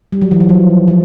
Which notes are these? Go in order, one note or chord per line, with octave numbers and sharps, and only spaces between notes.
G3
F#3
E3
F3
F#3
F3